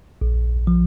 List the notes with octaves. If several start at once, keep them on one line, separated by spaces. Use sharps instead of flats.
A#1
F3